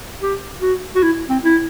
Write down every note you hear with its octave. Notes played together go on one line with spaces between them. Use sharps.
G4
F#4
F#4
E4
C4
E4